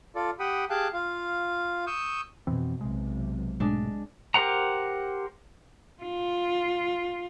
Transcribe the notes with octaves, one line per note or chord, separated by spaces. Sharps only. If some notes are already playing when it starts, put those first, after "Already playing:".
F4 A4 D5
G4 F#5 G5 B5 D#6
G4 G#4 F5 G5 A5 F#6
F4 F5
C#6 D#6 E6 G6
F2 B2 E3 C4
B1 C3 G#3
G#2 B2 G#3 A3 D4
G4 A#4 C5 F#5 A#5
F4